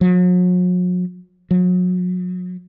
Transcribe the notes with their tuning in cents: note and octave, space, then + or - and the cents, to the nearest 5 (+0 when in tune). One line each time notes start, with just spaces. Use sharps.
F#3 -45
F#3 -35